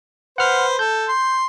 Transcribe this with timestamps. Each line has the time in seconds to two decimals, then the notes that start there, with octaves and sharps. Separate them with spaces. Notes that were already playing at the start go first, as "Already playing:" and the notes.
0.38 B4 C5 F#5 F6
0.79 A4 G6
1.08 C6